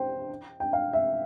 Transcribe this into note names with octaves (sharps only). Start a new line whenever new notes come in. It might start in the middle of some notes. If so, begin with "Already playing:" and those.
Already playing: C5 G5
G5
F5
E5